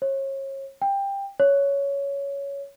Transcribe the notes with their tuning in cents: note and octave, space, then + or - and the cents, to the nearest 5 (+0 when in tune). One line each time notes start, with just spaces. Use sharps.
C#5 -35
G5 +15
C#5 +10